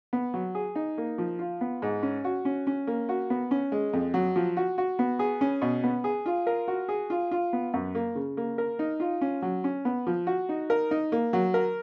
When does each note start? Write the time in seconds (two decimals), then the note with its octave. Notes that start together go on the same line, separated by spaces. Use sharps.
0.13 B3
0.34 F#3
0.55 G#4
0.75 D#4
0.98 A#3
1.18 F3
1.39 F4
1.61 B3
1.82 G#2
2.03 C#4
2.24 F#4
2.45 C#4
2.67 C#4
2.87 A#3
3.09 F#4
3.30 B3
3.51 C#4
3.72 G#3
3.93 F2
4.14 F#3
4.36 F3
4.57 F#4
4.78 F#4
4.99 B3
5.19 G#4
5.41 C#4
5.62 B2
5.84 B3
6.04 G#4
6.26 F4
6.47 A#4
6.68 F#4
6.89 G#4
7.10 F4
7.31 F4
7.53 B3
7.74 F#2
7.95 A#3
8.15 C#3
8.37 A#3
8.58 A#4
8.79 D#4
9.00 F4
9.21 C#4
9.42 F#3
9.64 C#4
9.85 B3
10.07 F3
10.27 F#4
10.49 D#4
10.70 A#4
10.91 D#4
11.12 A#3
11.33 F#3
11.54 A#4